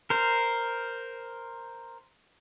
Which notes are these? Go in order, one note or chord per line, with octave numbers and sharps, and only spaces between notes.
A#4 C5